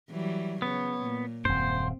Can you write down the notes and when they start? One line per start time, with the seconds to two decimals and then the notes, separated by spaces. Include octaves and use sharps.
0.11 E3 F#3 G3
0.62 C#3 B3 C#5
1.01 A#2
1.45 D#1 F#2 C4 C5